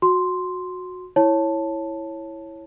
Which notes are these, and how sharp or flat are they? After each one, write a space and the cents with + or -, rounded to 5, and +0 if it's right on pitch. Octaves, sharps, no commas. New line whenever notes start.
F#4 -15 C6 +0
E4 +0 C#5 -10 A5 +0